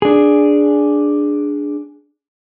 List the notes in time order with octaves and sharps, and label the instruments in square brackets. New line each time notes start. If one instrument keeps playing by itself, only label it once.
[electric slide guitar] D4 G#4